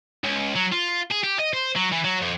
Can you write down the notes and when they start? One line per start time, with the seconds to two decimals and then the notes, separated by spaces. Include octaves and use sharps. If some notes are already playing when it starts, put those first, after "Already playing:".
0.24 C#2
0.56 F#3
0.72 F4
1.11 G#4
1.23 G4
1.39 D#5
1.53 C5
1.76 F#3
1.92 E3
2.04 F#3
2.22 F2